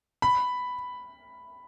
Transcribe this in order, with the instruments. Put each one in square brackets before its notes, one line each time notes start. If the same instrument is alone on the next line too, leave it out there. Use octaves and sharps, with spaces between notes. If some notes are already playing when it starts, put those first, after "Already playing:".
[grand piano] B5